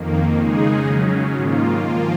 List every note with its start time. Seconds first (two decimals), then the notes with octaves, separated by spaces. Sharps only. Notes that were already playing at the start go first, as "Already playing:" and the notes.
Already playing: F2 D#3 A#3
0.38 C#3 G#3 D#4 G#4
0.86 C#3 F#3 C#4
1.34 G#2 D#3 A#3 F4
1.82 F3 A#3 F4